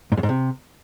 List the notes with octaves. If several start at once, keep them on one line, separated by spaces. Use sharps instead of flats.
G#2
F#2
G#2
C3